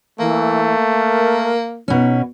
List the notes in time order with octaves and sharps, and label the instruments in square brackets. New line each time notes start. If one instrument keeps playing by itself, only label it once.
[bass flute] E3 [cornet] A3 [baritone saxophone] A#3
[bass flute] A#4
[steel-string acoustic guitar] B2 C#4 [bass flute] D#4